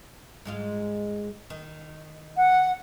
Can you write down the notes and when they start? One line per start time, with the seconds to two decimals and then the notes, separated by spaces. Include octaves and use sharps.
0.45 G#2 G#3 F4
1.50 D#3
2.37 F#5